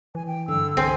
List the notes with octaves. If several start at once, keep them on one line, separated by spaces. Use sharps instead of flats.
E3 G#5
G5
G2 D3 E6
C2 C4 G#5